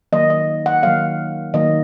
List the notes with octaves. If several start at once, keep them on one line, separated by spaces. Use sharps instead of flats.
D#3 F#3 A#3 D#5
D#5
F#5
D#3 F#3 A#3 F5
D#3 F#3 A#3 D#5